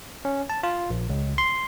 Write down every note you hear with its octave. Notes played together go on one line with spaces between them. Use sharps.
C#4
A5
F4
A#1
C#2
C6